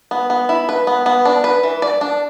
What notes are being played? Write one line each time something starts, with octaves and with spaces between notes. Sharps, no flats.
B3
B3
E4
B4
B3
B3
D4
B4
E3
D5
D4